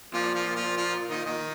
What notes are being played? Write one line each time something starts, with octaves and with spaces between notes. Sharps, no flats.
A#2 F3 F4
F3 F4
A#2
F3 F4
F3 F4
D#3 D#4
D#3 D#4